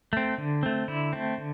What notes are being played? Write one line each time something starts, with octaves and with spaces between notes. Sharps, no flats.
A3 C4
D3
A3 C4
D3 E4
A3 C4
D3